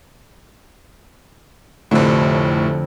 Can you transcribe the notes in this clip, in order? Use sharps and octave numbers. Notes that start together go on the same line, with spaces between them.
F1 F2 A2 D3